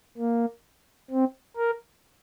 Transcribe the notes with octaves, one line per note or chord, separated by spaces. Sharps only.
A#3
C4
A#4